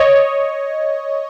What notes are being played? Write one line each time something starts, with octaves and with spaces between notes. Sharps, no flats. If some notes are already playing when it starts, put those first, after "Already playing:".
Already playing: C#5 D#5